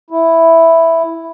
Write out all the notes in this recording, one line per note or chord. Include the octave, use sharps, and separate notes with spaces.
E4